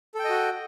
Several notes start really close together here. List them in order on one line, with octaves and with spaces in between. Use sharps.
A4 G5 D#5 F#4